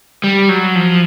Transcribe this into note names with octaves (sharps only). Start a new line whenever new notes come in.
G3
F#3
F3